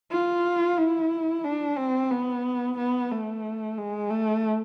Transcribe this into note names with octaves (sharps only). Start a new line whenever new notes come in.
F4
E4
D4
C4
B3
B3
A3
G#3
A3